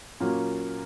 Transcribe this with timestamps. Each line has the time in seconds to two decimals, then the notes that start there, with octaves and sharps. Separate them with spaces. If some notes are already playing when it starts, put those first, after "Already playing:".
0.20 A#2 F#3 A#3 C#4